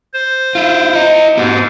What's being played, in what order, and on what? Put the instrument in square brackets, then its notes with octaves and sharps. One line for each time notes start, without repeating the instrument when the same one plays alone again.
[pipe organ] C5
[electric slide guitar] E4 F4
E4 D#5
[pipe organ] G#2 [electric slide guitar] B3 F#4 G4